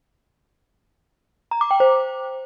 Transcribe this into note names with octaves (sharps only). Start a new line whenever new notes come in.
A#5
D6
G5
C5